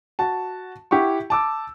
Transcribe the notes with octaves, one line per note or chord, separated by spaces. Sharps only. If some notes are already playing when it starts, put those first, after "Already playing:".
F#4 A5
E4 G4 F#5 C#6
A5 D6 E6